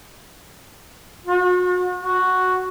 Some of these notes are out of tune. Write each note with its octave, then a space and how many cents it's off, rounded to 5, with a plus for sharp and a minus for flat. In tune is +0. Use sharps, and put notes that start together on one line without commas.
F#4 -40
F#4 +0